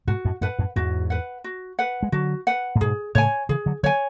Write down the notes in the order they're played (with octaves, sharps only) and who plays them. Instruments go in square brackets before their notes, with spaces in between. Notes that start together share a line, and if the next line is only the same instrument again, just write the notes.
[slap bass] G#2 B2 [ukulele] F#4
[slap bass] F#2 A2
[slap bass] F#2 A2 [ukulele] B4 F#5
[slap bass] F#2 A2
[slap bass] E2 G#2 [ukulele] F#4
[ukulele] B4 F#5
F#4
B4 F#5
[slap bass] G#3
[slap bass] D3 F#3 [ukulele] F#4
[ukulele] B4 F#5
[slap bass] A2
[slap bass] G#2 B2 [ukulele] G#4
[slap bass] A2 C#3 [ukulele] C#5 G#5
[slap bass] C#3 E3 [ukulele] G#4
[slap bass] D3 F#3
[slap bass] D3 F#3 [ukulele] C#5 G#5